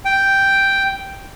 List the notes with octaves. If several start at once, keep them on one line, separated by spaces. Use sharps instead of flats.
G5